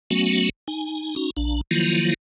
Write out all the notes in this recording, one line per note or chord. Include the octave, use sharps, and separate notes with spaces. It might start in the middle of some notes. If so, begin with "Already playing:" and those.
F#3 A3 B3 C#4 F#4
D#4 G#5
C#4 D#4 F#4
A#1 D4
D#3 F3 F#3 A#3 E4 F4